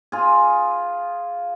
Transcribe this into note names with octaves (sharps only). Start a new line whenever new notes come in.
F4 G#4